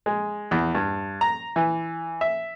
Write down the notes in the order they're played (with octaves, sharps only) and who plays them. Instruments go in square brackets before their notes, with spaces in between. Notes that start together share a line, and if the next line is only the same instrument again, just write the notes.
[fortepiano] G#3
E2
G2
A#5
E3
E5